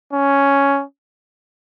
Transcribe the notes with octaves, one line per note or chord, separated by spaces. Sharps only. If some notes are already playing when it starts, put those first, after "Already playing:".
C#4